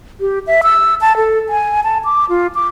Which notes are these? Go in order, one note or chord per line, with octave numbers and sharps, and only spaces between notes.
G4
E5
E6
A5
A4
G#5
A5
D6
F4
D6